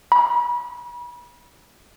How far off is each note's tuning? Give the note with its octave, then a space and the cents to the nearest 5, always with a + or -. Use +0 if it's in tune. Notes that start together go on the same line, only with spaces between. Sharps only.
B5 -35